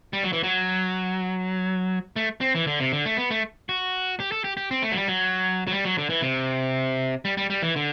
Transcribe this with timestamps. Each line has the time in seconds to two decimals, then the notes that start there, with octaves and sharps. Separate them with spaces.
0.13 G3
0.24 F#3
0.33 E3
0.43 F#3
2.16 A3
2.41 C4
2.55 E3
2.67 D3
2.80 C3
2.92 D3
3.05 A3
3.17 B3
3.31 A3
3.69 F#4
4.20 G4
4.32 A4
4.44 G4
4.57 G4
4.71 C4
4.82 A3
4.91 F#3
4.96 G3
5.08 F#3
5.67 F#3
5.72 G3
5.85 F#3
5.98 D3
6.09 E3
6.22 C3
7.25 G3
7.37 G3
7.50 G3
7.62 E3
7.76 D3